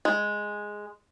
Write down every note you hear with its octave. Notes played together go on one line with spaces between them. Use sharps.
G#3